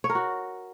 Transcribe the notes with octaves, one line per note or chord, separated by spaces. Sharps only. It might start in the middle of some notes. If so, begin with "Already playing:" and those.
C#5
A#4
F#4